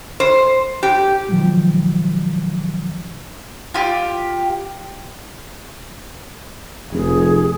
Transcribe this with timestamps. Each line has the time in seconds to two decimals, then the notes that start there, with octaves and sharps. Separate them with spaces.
0.20 C5
0.83 G4
1.29 B2 D#3 F3 F#3 G#3
3.74 F4 G4
6.92 F1 G#4